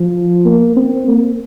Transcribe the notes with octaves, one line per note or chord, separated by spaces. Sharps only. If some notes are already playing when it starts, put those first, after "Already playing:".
Already playing: F3
A#3
C4
A#3